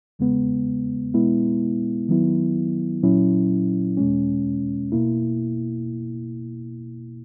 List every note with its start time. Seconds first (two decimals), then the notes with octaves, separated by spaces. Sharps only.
0.19 E2 C#3 G#3 B3
1.14 B2 G#3 B3 E4
2.09 D#3 F#3 B3 E4
3.03 A#2 F#3 C#4 E4
3.97 E2 B2 G#3 C#4
4.92 B2 A#3 E4